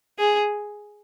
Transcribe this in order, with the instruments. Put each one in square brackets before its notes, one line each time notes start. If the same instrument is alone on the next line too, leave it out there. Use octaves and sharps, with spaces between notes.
[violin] G#4